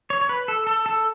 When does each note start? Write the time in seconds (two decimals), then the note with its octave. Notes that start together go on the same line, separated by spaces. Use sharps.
0.10 C#5
0.21 C#5
0.29 B4
0.48 A4
0.67 A4
0.86 A4